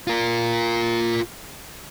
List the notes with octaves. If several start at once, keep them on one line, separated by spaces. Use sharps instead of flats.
F4 A#4